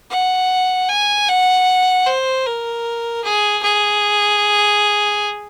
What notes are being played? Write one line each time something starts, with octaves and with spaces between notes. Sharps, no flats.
F#5
G#5
F#5
C5
A#4
G#4
G#4